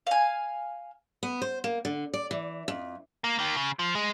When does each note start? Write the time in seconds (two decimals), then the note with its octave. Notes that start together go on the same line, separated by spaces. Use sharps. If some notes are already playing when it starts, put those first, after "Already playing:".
0.07 F5 G#5
1.23 B3
1.42 C5
1.64 A#3
1.85 D3
2.14 D5
2.31 E3
2.68 F2
3.24 A#3
3.39 D#3 A#3
3.56 C#3
3.79 F3
3.95 G#3